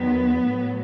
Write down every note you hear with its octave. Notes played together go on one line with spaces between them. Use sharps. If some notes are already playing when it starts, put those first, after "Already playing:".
Already playing: E2 D#3 F#3 B3
A2 F#3